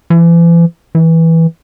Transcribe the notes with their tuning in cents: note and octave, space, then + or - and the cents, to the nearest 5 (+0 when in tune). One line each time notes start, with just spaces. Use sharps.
E3 +40
E3 -10